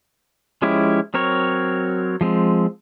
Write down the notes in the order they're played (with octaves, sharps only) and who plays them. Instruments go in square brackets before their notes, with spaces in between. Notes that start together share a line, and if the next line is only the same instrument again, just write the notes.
[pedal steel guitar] F3 G#3 C#4 E4 G4
F#3 C4 A#4 C#5
F3 G#3 C4